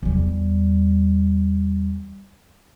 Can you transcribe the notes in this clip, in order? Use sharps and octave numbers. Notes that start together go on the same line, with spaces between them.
E2 G3